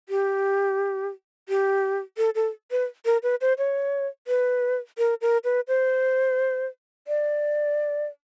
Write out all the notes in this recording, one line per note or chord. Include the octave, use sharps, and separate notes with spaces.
G4
G4
A4
A4
B4
A#4
B4
C5
C#5
B4
A#4
A#4
B4
C5
D5